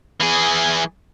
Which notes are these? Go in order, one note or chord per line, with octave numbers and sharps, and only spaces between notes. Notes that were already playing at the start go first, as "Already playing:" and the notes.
E3 G#4